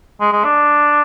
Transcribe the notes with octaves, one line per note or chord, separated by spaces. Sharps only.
G#3
G#3
D4